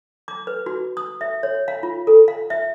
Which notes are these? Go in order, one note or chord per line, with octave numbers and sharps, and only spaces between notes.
D6
B4
F#4
D#6
E5
C#5
F5
F4
A4
F5
E5